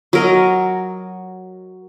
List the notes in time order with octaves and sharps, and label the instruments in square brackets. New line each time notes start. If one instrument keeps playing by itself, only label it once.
[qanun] F#3 A#4 D#5